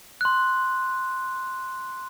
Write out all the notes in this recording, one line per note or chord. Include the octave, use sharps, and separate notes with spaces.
C6 F#6